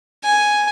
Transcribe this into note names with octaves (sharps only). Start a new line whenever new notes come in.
G#5